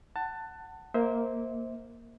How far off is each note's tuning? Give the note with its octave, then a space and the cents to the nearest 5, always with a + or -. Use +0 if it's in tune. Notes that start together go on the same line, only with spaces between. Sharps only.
F#5 +15 A5 +20
A#3 +0 C5 +0 E5 -40